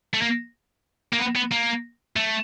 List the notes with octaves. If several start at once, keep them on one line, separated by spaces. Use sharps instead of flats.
A3
A#3
A#3
B3
B3
A#3
A3